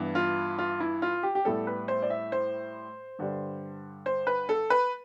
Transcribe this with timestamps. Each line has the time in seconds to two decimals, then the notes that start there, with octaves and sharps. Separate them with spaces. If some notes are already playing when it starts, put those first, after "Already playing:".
Already playing: G2 E3 B3
0.15 F4
0.58 F4
0.80 E4
1.02 F4
1.23 G4
1.35 G4
1.45 A2 G3 B3 A4
1.67 B4
1.88 C5
2.02 D5
2.10 E5
2.32 C5
3.19 G2 D3 G3
4.06 C5
4.27 B4
4.49 A4
4.70 B4